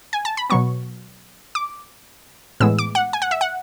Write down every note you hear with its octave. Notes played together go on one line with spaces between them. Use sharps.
G#5
A5
B5
B2 F#3 B3 C#6
D6
A2 E3 G#3 B3 E6
D6
F#5
G#5
F#5
E5
F#5